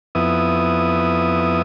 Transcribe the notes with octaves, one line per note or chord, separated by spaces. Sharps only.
F2 B3 E4 D#6